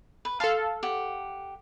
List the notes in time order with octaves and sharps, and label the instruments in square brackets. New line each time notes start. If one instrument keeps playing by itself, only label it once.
[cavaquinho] B4
[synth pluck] A4 F5 [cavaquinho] A5 C6
[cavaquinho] G4 F#5